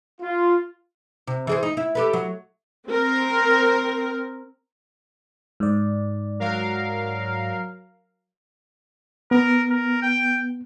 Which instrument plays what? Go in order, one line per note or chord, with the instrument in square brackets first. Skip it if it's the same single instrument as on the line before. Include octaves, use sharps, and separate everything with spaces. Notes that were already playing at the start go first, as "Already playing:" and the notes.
[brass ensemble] F4
[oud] C3
E3 G#4 C5
D#4
E4
G4 A4 B4
F#3
[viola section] C4 A#4
[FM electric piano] G#2 D5
[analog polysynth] F#3 A#4 F5
[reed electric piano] B3 [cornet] A#4
[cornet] A#4
G5